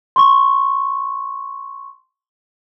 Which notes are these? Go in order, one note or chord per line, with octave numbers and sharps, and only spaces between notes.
C6 C#6